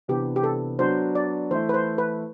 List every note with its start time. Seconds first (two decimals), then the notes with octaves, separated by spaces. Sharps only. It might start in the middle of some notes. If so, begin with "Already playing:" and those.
0.08 C3 E3 B3 D4 G4
0.36 G4
0.44 A4
0.79 F#3 B3 D4 F#4 C5
1.15 D5
1.51 E3 A3 E4 C5
1.69 B4
1.74 C5
1.98 B4